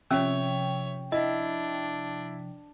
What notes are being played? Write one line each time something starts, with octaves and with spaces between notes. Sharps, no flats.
C3 F3 C#4 C#5 E5 G5 E6
D4 E4 D#5